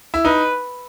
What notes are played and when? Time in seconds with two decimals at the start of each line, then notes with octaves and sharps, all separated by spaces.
0.14 E4
0.25 D#4 B4